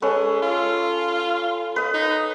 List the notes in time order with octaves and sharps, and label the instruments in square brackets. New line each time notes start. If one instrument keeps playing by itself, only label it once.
[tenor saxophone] G#3 [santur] C#4 A4 B4
[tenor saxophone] F4
[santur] B4 D#5
[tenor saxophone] D#4